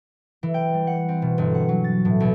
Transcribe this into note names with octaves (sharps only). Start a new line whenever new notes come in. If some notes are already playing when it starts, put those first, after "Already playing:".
E3
G5
G3
F#5
C4
B2
G1
F#5
F#3
A6
A2
B1